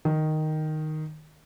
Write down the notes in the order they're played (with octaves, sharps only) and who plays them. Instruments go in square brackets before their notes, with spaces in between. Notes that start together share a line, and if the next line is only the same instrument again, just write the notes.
[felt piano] D#3